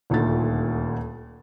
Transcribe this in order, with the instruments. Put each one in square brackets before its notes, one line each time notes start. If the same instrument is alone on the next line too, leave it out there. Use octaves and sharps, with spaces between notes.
[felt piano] D#1 D2 A#2 A3 D#4 A6